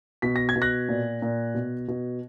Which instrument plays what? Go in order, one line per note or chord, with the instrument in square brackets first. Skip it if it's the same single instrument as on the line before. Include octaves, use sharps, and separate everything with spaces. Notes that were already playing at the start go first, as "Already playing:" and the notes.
[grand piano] B2 B6
A#6
G#6
B2
F#6 A#6
A#2
A#2
B2
B2